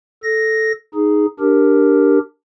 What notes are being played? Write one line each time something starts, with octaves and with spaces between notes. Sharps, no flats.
A4 A#6
D#4 G#4
D4 G4 A#4